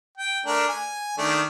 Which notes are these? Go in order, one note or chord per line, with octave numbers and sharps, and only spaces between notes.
G5
A3 D4 A#4
G#5
D#3 A3 D4